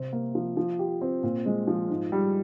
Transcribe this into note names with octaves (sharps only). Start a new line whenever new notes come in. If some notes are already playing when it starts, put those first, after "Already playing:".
Already playing: C3 C4
A#3
F3
F3
G4
C4
A#2
G#3
F3
G#2
G3